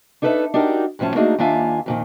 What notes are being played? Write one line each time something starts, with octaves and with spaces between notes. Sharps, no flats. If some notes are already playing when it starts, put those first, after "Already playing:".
D4 D#4 A4 B4 C#5 E5
D4 D#4 F#4 G4 A#4
F#2 A2 F3 C#4 A5
A3 A#3 D4 D#4 F#4 G#4
D#2 A#3 D4 F4 E5 G#5
F2 A#2 D#3